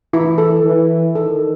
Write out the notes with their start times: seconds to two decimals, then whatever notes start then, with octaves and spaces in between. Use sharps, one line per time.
0.13 E3 E4
0.38 A4
0.64 E3
1.15 D#3 A4